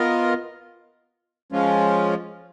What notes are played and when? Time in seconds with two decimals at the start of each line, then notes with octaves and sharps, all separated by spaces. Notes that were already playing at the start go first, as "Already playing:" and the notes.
Already playing: B3 F4 A#4 D#5
1.52 F3 G#3 C#4 F4